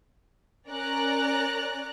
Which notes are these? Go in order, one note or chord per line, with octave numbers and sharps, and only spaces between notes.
C#4 A#4 D5 A#5 F#6